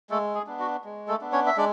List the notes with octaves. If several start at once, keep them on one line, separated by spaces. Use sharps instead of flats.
G#3 A3 A4
G#4
B3 D4
F#4
G#3
A3 A4
B3 D4
C#4 C#5
E5
G#3 D4 D5